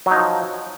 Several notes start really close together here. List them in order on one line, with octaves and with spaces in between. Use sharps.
F#3 D#4 F3